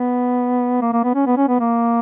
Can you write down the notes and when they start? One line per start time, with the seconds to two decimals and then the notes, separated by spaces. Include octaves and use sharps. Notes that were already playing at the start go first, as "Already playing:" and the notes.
Already playing: B3
0.81 A#3
0.93 A#3
1.04 B3
1.15 C#4
1.27 B3
1.37 C#4
1.48 B3
1.60 A#3